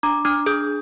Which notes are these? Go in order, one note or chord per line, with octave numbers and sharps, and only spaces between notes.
D4 A#5 D6
D4 D6 F6
G#4 D#6 G6